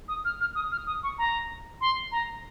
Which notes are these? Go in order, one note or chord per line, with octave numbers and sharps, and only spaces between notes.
D#6
F6
F6
D#6
F6
D#6
C#6
A#5
C6
A#5